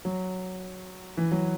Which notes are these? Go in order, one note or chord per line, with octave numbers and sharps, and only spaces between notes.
F#3
E3
F#3